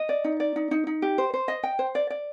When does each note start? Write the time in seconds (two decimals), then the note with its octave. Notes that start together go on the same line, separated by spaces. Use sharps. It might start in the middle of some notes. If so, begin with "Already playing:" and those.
Already playing: D#5
0.09 D5
0.24 D#4
0.40 D5
0.56 D#4
0.71 D#4
0.87 D#4
1.02 G4
1.18 C5
1.34 C5
1.48 D#5
1.63 G5
1.79 C5
1.95 D5
2.10 D5